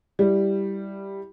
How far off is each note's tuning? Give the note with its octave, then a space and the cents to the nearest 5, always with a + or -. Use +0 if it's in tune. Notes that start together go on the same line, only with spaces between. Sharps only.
G3 +0 E4 +0